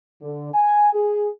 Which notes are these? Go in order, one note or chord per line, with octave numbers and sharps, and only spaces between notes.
D3
G#5
G#4